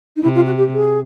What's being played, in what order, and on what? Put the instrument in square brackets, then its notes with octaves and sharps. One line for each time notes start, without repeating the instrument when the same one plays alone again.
[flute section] D#4
[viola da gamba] C3 [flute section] E4
[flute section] F4
F#4
G4
G#4